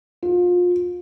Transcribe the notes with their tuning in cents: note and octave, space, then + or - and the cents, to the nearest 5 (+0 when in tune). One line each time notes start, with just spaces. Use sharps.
F4 +30